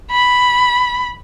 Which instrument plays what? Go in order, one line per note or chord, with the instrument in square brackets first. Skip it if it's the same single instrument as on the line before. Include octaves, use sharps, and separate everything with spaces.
[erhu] B5